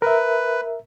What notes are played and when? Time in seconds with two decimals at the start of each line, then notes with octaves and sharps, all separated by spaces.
0.02 A#4 B4 E5